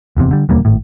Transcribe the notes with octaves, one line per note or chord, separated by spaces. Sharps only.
F1 E2 C3
D3 G3
E1 D2 G3 A#3
G#1 A2